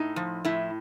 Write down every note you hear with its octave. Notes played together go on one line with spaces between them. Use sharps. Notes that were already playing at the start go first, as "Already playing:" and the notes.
Already playing: A2 D#4
F3
A2 E4